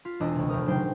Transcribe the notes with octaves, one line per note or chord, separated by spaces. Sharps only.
F4 B6
E1 D4 D#5 E6
D2 C3
F1 A#2 A3 G4 A#4 D#6
D#1 C#3 F#3 D#4 C5 G5